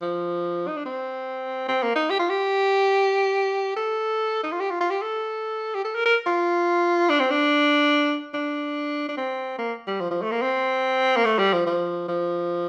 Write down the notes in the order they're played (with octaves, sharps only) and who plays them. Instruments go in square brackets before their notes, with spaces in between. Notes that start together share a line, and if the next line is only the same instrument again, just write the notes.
[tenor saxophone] F3
D#4
D4
C4
C4
A#3
D#4
G4
F4
G4
A4
D#4
F4
G4
F4
F4
G4
A4
G4
A4
A#4
A#4
F4
D4
C4
D4
D4
D4
C4
A#3
G3
F3
F3
A3
A#3
C4
A#3
A3
G3
F3
F3
F3